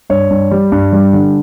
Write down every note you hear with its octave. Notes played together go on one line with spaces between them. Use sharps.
G2 C#5
G2
G3
G2
G3
D3